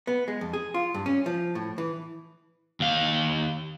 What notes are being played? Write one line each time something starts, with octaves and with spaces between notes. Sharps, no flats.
B3
G#3
F2
G#4
F4
G2
C#4
F3
A2
E3
D#2 F5